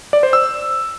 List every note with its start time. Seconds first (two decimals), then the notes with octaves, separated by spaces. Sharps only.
0.13 D5
0.23 C5
0.33 E6